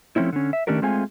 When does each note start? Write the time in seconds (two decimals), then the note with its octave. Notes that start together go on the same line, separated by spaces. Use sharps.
0.16 F3 A3 C4 C#4 E4
0.33 D3 C#4
0.53 E5
0.67 D#3 A3 C#4 D4 G4 A#4
0.82 G#3 A3 C4 F4 G#4 G#5